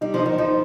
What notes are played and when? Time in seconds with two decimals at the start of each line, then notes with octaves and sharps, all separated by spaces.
0.01 G3 D#4
0.14 F3
0.19 D#4
0.26 D#3
0.38 F3 D#4